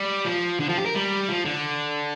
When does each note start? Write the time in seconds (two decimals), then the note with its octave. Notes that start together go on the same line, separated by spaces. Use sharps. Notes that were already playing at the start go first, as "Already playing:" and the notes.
Already playing: G3
0.26 F3
0.60 D3
0.69 F3
0.77 G4
0.86 A#4
0.94 G3
1.29 F3
1.45 D3